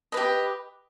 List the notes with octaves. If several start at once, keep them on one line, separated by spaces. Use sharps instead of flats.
G4 B4 D#5